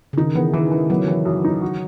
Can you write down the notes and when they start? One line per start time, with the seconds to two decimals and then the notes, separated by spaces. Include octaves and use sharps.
0.13 C#3
0.18 D#3 D#4
0.35 E3 B3
0.53 D#3 E3
0.72 E3
0.90 F#3 B3
1.08 E3
1.25 F#2
1.45 D#4
1.62 F#4